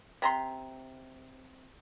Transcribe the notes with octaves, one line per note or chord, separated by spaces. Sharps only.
C3 A#5 C6